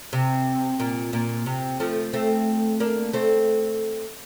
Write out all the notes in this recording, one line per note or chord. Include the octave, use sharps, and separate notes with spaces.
C3
A#2
A#2
C3
F3 A3
A3 C4
A#3 D4
A3 C4